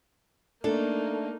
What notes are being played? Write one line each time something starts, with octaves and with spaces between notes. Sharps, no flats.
A3 A#3 D4 D#4 A4